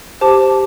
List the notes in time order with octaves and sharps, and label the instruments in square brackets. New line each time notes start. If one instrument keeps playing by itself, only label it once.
[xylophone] G4 C5 A5 D6